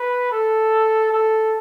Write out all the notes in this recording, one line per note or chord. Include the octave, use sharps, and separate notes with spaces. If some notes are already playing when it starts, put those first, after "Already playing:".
Already playing: B4
A4
A4